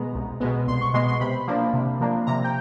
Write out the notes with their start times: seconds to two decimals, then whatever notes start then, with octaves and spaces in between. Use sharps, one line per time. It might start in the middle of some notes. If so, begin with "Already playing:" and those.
Already playing: B2 G#3 B3 A#5
0.15 C2
0.40 B2 G#3 B3
0.67 C2 C6
0.81 C#6
0.94 B2 G#3 B3 C6
1.08 C6
1.21 C3 B5
1.48 F3 A#3 D4
1.73 C3
2.01 F3 A#3 D4
2.27 C3 A#5
2.44 G5